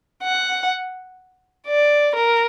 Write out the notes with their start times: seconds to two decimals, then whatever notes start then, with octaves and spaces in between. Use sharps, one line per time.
0.23 F#5
1.67 D5
2.15 A#4